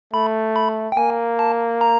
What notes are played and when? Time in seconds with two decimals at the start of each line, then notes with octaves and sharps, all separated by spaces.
0.13 A3 B5
0.56 B5
0.92 G5
0.97 A#3 G#5
1.39 A5
1.81 A#5